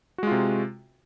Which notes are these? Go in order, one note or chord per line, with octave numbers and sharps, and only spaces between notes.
C3 G#3 F4 F#4